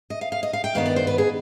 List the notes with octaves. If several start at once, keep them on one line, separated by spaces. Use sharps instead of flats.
D#5
F5
F5
D#5
F5
G5
G2 D#3 B3 F5
D5
C5
B4
G#4